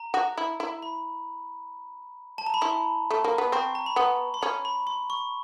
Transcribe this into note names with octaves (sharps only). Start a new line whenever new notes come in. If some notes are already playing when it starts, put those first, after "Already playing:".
Already playing: A#5
F#4
E4
E4
B5
A5
A#5
B5
E4 C6
A3
A#3
B3
C4 C#6
A#5
B5
B3 C6
C6
C#4 B5
B5
C6
C#6